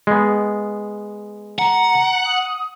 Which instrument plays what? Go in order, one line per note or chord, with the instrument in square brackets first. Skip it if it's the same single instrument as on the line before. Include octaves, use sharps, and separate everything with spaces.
[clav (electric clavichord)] G#3 B3
[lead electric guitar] F#5 [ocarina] A#5
[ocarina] D#6